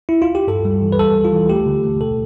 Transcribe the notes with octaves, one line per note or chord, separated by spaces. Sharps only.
E4
F4
G4
G2 A4
G3
E3
B4
G3 A4
G3
F4
E3
A3 G4
D3
A3
B2 A4